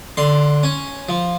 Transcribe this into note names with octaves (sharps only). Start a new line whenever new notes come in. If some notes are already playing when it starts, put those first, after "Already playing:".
D3 C6
C#4
F3